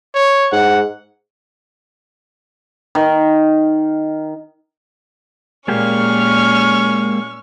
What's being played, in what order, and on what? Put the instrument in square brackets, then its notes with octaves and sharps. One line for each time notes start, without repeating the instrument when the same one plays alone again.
[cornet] C#5
[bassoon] G#2 [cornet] F#5
[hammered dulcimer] D#3
[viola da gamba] A#2 [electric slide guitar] G#3 A#3 G4 [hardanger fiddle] C#4 C#6 [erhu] F6